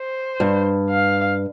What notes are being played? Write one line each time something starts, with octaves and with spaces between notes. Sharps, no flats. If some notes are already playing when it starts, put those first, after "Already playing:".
Already playing: C5
G2
F5